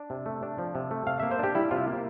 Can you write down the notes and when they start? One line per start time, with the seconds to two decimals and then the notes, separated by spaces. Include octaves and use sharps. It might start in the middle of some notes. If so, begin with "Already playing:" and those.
Already playing: D4
0.10 C3
0.26 A3
0.43 D4
0.58 F3
0.75 C3
0.91 A3
1.07 C3 F5
1.20 A#3 E5
1.31 C5
1.39 D4 G4
1.55 G3 E4
1.71 C3 F4
1.87 A#3